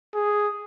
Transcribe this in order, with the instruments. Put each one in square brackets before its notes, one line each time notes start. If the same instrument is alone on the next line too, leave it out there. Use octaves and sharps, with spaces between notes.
[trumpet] G#4